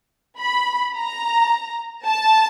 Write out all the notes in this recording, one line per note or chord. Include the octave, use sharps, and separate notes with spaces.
B5
A#5
A5